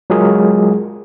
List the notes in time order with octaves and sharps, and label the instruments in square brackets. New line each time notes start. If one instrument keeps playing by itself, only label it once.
[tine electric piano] F#3 G#3 F4 G#4 A#4